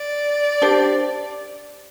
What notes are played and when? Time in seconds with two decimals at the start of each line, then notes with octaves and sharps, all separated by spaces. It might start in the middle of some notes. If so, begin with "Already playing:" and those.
Already playing: D5
0.62 D4 G4 C5